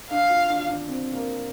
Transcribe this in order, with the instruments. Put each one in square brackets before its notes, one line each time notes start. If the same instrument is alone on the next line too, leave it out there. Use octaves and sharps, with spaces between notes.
[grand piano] D4 [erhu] F5
[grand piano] F4
D4
F4
D4
C4
A#3